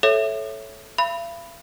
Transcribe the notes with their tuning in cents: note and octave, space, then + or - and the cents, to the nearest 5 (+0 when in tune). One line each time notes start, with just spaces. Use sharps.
A4 -10 C#5 -10 E5 +0
F5 -45 B5 +0